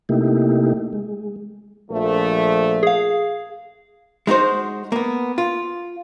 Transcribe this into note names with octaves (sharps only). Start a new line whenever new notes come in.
C3 A3 A#3 D#4 E4 G4
G#3
A#1 F3 A3
G#4 F5
G#3 D#4 F#4 C5
A#3 B3
F4